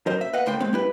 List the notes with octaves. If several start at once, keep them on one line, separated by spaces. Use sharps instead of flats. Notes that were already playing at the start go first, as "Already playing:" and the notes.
F#2 F#3 A#4 C5 D#5
E5
B4 D#5 F5 F#5
C#2 A2 C5 G5 C6
G#3 A#3 C4
G3 E4 B4